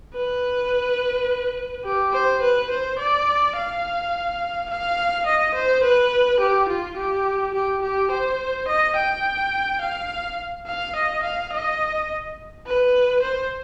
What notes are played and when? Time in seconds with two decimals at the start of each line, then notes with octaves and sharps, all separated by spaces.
0.14 B4
1.85 G4
2.13 C5
2.42 B4
2.70 C5
2.99 D5
3.56 F5
4.70 F5
5.26 D#5
5.55 C5
5.83 B4
6.40 G4
6.68 F4
6.97 G4
7.54 G4
7.82 G4
8.11 C5
8.68 D#5
8.96 G5
9.81 F5
10.67 F5
10.95 D#5
11.23 F5
11.52 D#5
12.66 B4
13.22 C5